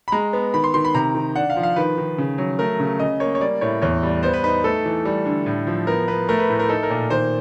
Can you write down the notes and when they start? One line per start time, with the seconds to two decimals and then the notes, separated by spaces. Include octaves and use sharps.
0.08 B5
0.12 G#3 A#5
0.33 B3
0.54 D#3 B5
0.64 C6
0.74 D#3 C6
0.84 B5
0.95 C3 A#5
1.15 D#3
1.36 D4 F#5
1.50 F5
1.56 F3
1.63 F5
1.76 D#3 B4
1.98 D#3
2.18 C#3
2.38 F#3
2.59 A3 A#4
2.80 C#3
2.99 C#3 D#5
3.20 A#3 C#5
3.35 C#5
3.41 G3 D5
3.61 A2 C#5
3.82 E2 C#5
4.03 G3
4.23 B3 C5
4.33 B4
4.43 D#4 B4
4.64 A3 A4
4.85 E3
5.05 G3
5.25 D3
5.46 A2
5.67 F3
5.87 B3 A#4
6.08 B3 B4
6.29 A3 A#4
6.39 B4
6.49 A2
6.59 A#4
6.69 D#4 A4
6.83 A#4
6.90 A#2
7.10 D#3 C5